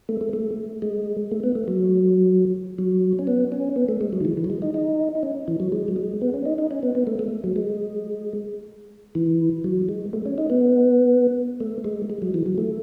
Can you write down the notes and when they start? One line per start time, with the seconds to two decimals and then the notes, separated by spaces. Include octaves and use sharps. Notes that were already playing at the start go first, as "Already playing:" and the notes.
0.09 A3
0.21 A3
0.33 A3
0.82 G#3
1.31 A3
1.43 B3
1.55 A3
1.68 F#3
2.78 F#3
3.19 C#4
3.27 B3
3.52 C#4
3.76 B3
3.88 A3
4.01 G#3
4.13 F#3
4.21 D#3
4.25 E3
4.37 E3
4.44 F#3
4.50 G#3
4.62 D#4
4.74 D#4
5.15 D#4
5.23 C#4
5.48 E3
5.60 F#3
5.72 G#3
5.88 F#3
5.96 G#3
6.21 B3
6.34 C#4
6.45 D#4
6.58 D#4
6.71 C#4
6.83 B3
6.95 B3
7.07 A3
7.19 A3
7.44 F#3
7.56 G#3
9.15 E3
9.64 F#3
9.89 G#3
10.13 A3
10.26 C#4
10.38 D#4
10.50 B3
11.60 A3
11.84 G#3
12.10 G#3
12.22 F#3
12.34 E3
12.46 F#3
12.58 A3